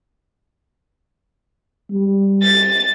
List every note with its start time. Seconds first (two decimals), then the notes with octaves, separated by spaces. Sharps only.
1.90 G3
2.42 A6